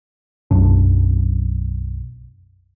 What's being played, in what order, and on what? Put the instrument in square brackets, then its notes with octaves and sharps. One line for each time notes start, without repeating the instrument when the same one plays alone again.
[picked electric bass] B1 F#2 D4